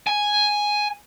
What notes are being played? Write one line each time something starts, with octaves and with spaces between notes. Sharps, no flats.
G#5